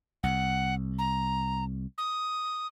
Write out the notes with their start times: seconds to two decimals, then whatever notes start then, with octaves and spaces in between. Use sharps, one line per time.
0.23 C2 F#5
0.99 A#5
1.98 D#6